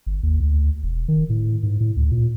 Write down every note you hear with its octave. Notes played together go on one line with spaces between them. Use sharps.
G1
D#2
D2
E1
D#3
A2
G#2
A2
D2
A#2